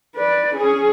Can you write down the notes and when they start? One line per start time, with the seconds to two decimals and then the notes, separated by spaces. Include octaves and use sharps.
0.16 B4 D5
0.55 C#4 G#4